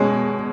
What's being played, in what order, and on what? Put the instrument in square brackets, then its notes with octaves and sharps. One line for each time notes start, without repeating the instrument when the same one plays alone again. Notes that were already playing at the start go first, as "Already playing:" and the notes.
Already playing: [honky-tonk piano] B2 G#3 C#4 C#5